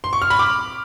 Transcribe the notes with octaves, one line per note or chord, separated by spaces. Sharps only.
C6
C#6
F6
B5
D6